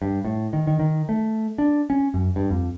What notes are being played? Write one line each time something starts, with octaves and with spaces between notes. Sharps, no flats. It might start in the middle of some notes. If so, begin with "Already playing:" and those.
G2
A2
D#3
D#3
D#3
A3
D4
C#4
F#2
G2
F2